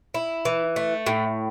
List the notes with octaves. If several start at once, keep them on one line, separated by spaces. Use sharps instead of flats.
E4
E3
A3
A2